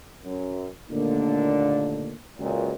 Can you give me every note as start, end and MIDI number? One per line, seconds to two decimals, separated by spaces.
0.24 0.67 42
0.90 2.13 39
0.90 2.13 46
0.90 2.13 50
0.90 2.13 57
0.90 2.13 58
0.90 2.13 62
2.38 2.73 37
2.38 2.73 42
2.38 2.73 46